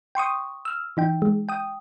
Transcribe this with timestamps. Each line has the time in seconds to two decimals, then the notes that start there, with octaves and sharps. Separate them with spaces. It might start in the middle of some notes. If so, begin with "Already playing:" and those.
0.15 G5 C6 C#6 D#6
0.65 E6 F6
0.97 E3 D#4 G5
1.22 G#3
1.49 G5 D#6